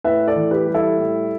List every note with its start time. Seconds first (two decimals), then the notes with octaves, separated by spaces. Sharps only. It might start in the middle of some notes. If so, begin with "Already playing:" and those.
0.04 A2 B4 E5
0.27 A4 D5
0.36 E3
0.51 G4 B4
0.67 G3
0.74 E4 A4
0.98 A2